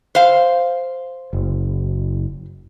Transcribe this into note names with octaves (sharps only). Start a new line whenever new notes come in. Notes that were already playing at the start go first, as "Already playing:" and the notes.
C5 F5
F#1